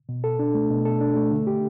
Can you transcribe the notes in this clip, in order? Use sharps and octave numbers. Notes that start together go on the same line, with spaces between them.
B2
A4
D4
A3
B2
A4
D4
A3
D3
G4